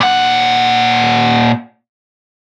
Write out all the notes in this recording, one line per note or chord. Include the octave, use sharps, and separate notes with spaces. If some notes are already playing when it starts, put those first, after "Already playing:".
A#2 F#5